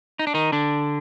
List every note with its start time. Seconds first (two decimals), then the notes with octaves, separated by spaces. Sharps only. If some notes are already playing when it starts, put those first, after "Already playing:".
0.19 D#4
0.27 D4
0.34 D#3 D#4
0.52 D3 D4